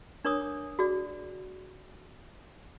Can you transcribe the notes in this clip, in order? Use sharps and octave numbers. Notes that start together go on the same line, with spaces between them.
D4 A#4 C#5 D6 D#6
F#4 G#4 D5